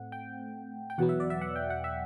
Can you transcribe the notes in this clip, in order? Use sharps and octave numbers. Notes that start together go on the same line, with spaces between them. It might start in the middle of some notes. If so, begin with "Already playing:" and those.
Already playing: A2 A3 C4 F#5
G5
G5
E2 B2 F#3 B3 F#5
E5
D5
E5
F#5
G5
F#5
E5